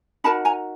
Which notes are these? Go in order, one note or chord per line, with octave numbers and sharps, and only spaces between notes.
D#4 F#4 A#4 A5 B5
G#5 A#5